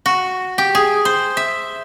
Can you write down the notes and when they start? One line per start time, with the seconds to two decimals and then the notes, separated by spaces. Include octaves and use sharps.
0.06 F#4
0.58 G4
0.75 G#4
1.05 C5
1.37 E5